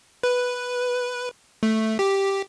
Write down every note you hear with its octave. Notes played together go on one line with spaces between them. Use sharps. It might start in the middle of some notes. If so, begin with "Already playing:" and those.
B4
A3
G4